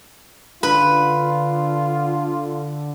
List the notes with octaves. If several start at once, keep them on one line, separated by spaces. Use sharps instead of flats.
D3 F4 B4